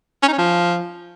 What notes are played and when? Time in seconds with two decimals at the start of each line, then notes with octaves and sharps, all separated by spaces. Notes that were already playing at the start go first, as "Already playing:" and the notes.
0.22 C#4
0.28 D#4
0.33 C#4
0.38 F3